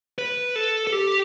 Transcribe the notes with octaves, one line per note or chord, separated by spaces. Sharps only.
B4
A4
A4
G4